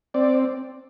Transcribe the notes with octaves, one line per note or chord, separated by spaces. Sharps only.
C4 D5